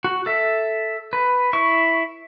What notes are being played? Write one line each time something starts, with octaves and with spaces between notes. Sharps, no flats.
F#4
A4 E5
B4
E4 C#6